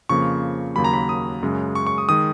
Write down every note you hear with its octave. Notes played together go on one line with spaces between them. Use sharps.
F2 C#3 F3 A#3 C#6
D#2 C#3 F#3 A#3 B5
A#5
B5
D#6
F#2 C#3 G#3
C#6
C#6
D#6
D#3 G#3 D#6